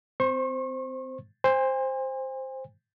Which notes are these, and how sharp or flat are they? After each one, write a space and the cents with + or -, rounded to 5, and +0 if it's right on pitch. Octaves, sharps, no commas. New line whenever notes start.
C4 -25 C5 +0 C#6 -40
C5 +5 G#5 -45